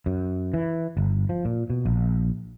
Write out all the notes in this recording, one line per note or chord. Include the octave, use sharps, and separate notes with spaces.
F#2
E3
G1
F3
A#2
B2
A#1